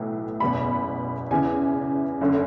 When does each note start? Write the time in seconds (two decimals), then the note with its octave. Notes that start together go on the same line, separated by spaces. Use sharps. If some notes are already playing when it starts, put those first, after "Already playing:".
Already playing: B1 A2 E3
0.40 F#1 E2 B2 B5
1.31 E2 C#3 E3 G#5
2.21 F#1 F#2 D3